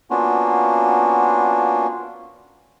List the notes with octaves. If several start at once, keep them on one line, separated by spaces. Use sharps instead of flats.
A#3 B3 C#4 D4 F4 F#4